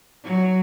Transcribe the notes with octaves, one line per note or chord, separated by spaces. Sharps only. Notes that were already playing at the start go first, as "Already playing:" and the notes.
F#3